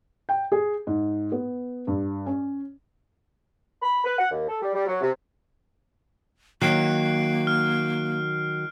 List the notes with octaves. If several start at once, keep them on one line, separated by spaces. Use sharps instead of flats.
G5
G#4
G#2
B3
G2
C#4
B5
B4
F#5
D#2
A4
G3
G3
F#3
C3
D#3 F#3 A#3 F#6 C7 D7
F6